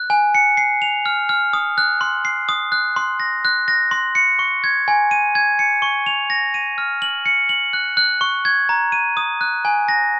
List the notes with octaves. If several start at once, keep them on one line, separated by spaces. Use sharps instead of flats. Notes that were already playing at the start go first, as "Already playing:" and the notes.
Already playing: F#6
G#5
C#7
C7
F7
F6
F6
D#6
F#6
C6
C7
D#6
F#6
C6
A#6
F#6
A#6
C6
C#7
C#6
G#6
G#5
D#7
G#6
C#7
C#6
F7
A#6
D#7
F6
F#7
C#7
F#7
F#6
F#6
C#6
G#6
A#5
D#7
D#6
F#6
G#5
A#6